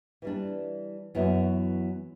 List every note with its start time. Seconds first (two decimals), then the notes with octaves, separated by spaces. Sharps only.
0.22 E3 G3 D4
1.15 F#2 E3 B3 F#4